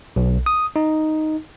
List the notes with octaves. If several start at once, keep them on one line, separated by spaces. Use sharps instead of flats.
B1
D#6
D#4